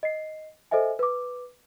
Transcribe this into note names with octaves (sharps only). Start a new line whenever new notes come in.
D#5 C7
A4 C5 D#5 E5 G#5
B4 D6